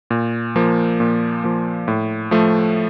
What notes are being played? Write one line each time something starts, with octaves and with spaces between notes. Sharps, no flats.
A#2
F3 A#3
A#2
F3 A#3
A2
F3 A3